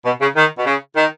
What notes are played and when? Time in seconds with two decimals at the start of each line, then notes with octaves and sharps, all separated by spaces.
0.05 B2
0.20 C#3
0.35 D#3
0.58 B2
0.65 C#3
0.96 D#3